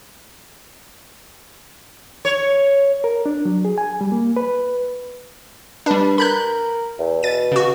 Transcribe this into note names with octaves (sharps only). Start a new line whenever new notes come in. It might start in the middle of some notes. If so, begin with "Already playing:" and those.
C#5
A#4
D4
F#3
G#4
G#5
G3
A#3
B4
G3 D4 B4
A#4 B5 F#6 G6
E2
B2 A6 D#7
C#3 F#4